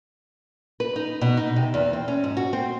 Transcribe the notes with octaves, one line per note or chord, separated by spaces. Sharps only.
B4
D#4
B2
D#4
C3
E2
C4
C#4
G#2
F#4
C4